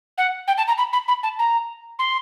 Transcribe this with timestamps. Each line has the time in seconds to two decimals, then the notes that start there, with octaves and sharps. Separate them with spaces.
0.18 F#5
0.48 G5
0.58 A5
0.68 A#5
0.78 B5
0.93 B5
1.08 B5
1.23 A5
1.39 A#5
1.99 C6